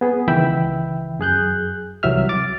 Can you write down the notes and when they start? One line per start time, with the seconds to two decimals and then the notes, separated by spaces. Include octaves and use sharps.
0.01 B3 G#4
0.28 C#2 D#3 E3 E5 G5 B5
1.19 F#2 G#4 F#6 G6
2.03 C2 E3 F#3 E5 F6
2.29 D6 A6